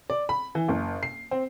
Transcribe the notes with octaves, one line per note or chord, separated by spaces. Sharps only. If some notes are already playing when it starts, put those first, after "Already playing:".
D5
B5
E3
F#1
C7
C4